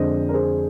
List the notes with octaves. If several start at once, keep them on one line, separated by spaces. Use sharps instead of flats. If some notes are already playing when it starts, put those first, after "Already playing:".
Already playing: F2 D3 G#3 C5 D#5
A#4
G#4 C5